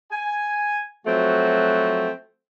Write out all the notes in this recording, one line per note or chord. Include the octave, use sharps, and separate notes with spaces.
G#5
F3 F#3 A3 C4 F#4